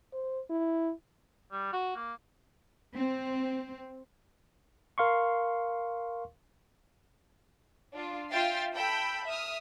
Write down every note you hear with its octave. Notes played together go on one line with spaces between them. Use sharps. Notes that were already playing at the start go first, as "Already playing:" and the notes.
C5
E4
G3
F#4
A#3
C4
A#4 F5 C6 C#6
D4 F4
F4 E5 F5 G5 A6 C7
A4 G5 B5 E6 G6
E5 D#6 F6